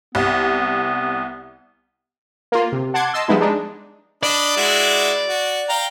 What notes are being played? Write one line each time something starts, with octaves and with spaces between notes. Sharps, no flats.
C2 B3
A#3 F4
C3
F#5 A5 C6 D6 G#6
D#5 A5 C6 E6
F3 G3 G#3 B3 D#4 E4
G#3 D4 D#4
D4 D5 D#5 B5
G#3 E4 F#4
F#4
F5 G5 A#5